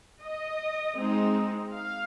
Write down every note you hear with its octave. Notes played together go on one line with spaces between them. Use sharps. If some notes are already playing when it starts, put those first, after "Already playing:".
D#5
G#3 C4 D#4
F5